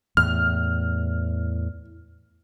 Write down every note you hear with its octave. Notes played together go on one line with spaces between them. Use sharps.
E2 A2 F6